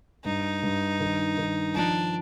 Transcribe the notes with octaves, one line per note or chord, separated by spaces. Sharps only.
G2 D#4
G2
D#3
D#3
F3 D4